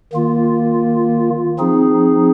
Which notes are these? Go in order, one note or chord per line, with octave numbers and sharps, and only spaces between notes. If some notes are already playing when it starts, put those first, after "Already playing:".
D#3 A#3 F4
F3 C4 D#4 G#4